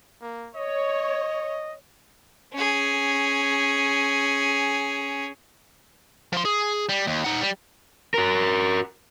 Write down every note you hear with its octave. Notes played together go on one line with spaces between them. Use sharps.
A#3
C#5 D#5
C#4 G#4
F3 C6
G#4
G3
D#2
D#4 F#5
G3
F#4 A#4